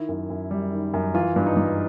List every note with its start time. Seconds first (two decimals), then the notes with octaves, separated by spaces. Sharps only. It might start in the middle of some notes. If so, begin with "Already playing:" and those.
Already playing: D#3 E4
0.09 F#2
0.30 F#2
0.51 G3
0.72 D#3
0.94 F#2
1.14 E3 F4
1.36 G2
1.46 D#4
1.57 G2